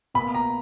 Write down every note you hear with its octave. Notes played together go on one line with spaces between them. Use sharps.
B2 A#3 B5
A#5